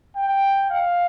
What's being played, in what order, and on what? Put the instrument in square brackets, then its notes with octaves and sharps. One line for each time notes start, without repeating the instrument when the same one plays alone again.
[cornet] G5
F5